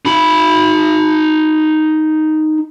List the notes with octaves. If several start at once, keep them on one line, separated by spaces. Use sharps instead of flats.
D#4 B5